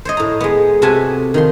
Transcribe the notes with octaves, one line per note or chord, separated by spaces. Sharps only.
C5 C#5 D#5
A2 A#5
G#3 B3
C3 F#4 A4 B4 G#5 A5
D#3 F3 C6